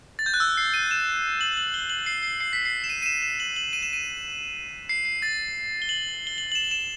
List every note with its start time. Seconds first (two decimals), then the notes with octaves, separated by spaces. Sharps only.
0.19 A6
0.26 G6
0.34 F#6
0.40 E6
0.57 C7
0.74 D#7
0.91 E7
1.41 F#7
1.57 F#7
1.74 G7
1.90 F#7
2.06 C7
2.23 C7
2.40 C7
2.53 B6
2.65 C7
2.84 E7
2.89 D#7
3.02 D#7
3.06 E7
3.22 E7
3.40 F#7
3.56 F#7
3.73 D#7
3.83 E7
3.93 D#7
4.89 C7
5.05 C7
5.22 A6
5.82 G7
5.89 F#7
6.27 G7
6.38 F#7
6.52 F#7
6.55 E7
6.71 E7